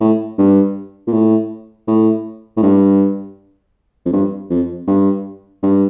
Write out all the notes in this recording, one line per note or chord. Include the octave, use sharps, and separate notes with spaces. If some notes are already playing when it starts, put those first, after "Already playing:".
A2
G2
A#2
A2
A2
A2
G2
F2
G2
F2
G2
G2